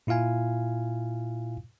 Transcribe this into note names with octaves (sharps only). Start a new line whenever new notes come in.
A#2 E4 F4 F5 G#5